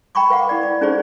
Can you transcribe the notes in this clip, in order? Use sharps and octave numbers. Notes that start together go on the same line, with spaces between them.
G5 A#5 B5 C#6 D6
B4 F5 F#5
E4 D5
D5
C#4 D#4 F4 G#4 C5 D5